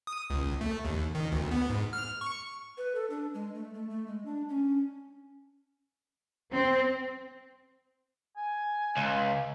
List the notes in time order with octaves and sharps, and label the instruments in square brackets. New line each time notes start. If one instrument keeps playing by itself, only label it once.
[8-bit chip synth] D#6
C#2
A3
D#2
D#3
D2
B3
G#2
F6
C#6
[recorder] B4
A4
D4
G#3
A3
A3
A3
G#3
D4
C#4
[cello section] C4
[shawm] G#5
[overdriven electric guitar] C#2